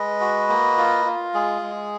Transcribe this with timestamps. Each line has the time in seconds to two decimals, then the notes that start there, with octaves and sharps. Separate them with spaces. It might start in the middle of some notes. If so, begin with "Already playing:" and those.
Already playing: G#3 B4 D#5
0.21 F#4
0.49 A#3
0.78 F4
1.06 F4
1.34 G#3 G#4
1.62 G#3